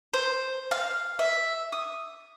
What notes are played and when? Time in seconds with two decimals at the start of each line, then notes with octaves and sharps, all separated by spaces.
0.14 C5
0.71 F5
1.19 E5
1.72 D#6